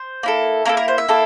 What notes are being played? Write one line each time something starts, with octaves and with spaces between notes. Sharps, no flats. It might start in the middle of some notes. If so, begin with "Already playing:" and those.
Already playing: C5
A#3 E4 A4
A#3 E4 A4 A#4
A#4
C5
E5
A#3 E4 A4